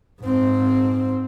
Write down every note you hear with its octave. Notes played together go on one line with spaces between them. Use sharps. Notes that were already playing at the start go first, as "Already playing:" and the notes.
G#2 C4